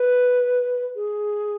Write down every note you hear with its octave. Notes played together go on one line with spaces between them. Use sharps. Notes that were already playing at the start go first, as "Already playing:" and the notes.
Already playing: B4
G#4